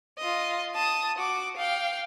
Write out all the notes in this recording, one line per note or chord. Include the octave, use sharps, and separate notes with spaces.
F4 D#5
A5 D#6
F#4 D6
F5 G5